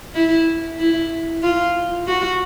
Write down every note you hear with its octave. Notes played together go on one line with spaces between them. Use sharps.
E4
E4
F4
F#4